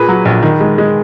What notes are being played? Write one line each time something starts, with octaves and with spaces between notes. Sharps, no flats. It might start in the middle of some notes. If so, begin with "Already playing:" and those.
Already playing: A#2 G#4 B4
F#3
A#1
D#3
G#3
G#3